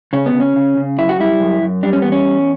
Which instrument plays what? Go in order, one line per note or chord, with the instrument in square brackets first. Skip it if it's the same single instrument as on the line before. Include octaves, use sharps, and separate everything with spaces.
[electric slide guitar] C#3 C#4
B3
C#3
C#4
C#3
C#3
F#2 E4
F#4
G3 E4
F#2
F#2
G3 D4
C#4
E2 B3
C#4
E2